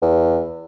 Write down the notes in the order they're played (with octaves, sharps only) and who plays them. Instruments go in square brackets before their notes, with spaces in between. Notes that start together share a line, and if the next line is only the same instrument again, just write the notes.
[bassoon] E2